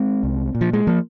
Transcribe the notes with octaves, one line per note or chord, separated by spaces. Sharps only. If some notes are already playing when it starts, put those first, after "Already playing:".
Already playing: G#3 C4
C2
A#2
F3
G#3
F3 A#3